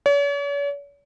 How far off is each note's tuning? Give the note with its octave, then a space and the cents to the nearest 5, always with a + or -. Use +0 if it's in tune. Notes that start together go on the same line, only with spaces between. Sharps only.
C#5 +45